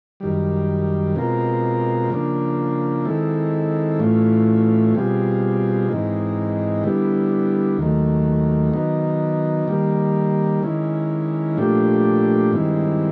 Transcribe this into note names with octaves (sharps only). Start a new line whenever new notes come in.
F#2 D#3 G3
B2 G#3 C4 F4 A#4
C#3 F3 A#3 D4
D#3 G#3 C4 E4 A4
A2 E3 A3 C#4 F4
B2 G3 C4 F4 G#4
G#2 E3 G#3 C4 D#4
D3 G3 B3 E4
D#2 D#3 F#3 A3
D#3 F#3 B3 D#4
D#3 G3 A#3
D#3 G#3 C#4 E4
A#2 F3 A3 D4 G4
G2 D#3 G#3 C4 E4